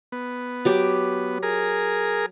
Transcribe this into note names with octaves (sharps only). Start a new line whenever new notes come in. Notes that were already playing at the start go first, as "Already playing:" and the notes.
B3
F#3 G4 D6
G#4 A#4